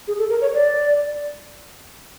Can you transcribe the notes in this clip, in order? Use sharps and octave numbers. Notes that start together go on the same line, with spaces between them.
G#4
A4
A#4
C#5
D5